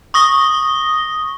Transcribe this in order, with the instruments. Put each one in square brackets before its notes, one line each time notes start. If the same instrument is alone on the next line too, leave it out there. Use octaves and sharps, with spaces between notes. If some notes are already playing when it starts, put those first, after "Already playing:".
[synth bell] C#6 D#6 A#6 G7